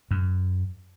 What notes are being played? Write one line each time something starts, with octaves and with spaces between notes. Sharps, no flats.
F#2